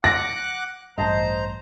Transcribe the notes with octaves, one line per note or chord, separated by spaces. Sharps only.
F#5 D6 F#6 A#6
A1 G2 C5 D#5 A5 A#5